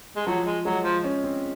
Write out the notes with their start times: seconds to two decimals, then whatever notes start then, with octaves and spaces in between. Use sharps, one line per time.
0.16 G#3
0.27 F3 F#3
0.46 G#3
0.65 F#3 G#3
0.84 F3
1.04 C#4
1.24 C4